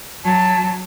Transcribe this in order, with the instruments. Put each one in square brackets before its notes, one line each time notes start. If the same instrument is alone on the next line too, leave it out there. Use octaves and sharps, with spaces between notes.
[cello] F#3 [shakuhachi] A5